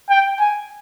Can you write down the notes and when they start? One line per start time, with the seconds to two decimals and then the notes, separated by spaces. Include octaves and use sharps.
0.10 G5
0.40 G#5